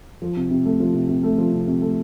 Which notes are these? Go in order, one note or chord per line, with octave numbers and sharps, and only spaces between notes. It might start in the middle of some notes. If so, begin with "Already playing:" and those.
F3
C3
C3
A3
F3
C3
C3
A3
F3
C3
C3
A3